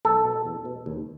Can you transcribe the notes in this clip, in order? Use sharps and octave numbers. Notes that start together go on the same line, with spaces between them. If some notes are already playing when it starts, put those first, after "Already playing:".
B1 A4
B2
E2
B2
D#2